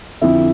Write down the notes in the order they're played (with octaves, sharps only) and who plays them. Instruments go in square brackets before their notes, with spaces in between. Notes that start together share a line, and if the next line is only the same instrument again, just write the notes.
[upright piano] F2 D3 F3 E4 E5